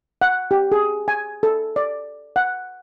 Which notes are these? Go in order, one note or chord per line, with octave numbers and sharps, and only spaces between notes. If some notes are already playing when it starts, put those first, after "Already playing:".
F#5
G4
G#4
G#5
A4
D5
F#5